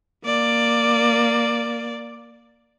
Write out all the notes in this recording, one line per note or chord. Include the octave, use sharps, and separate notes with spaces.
A#3 D5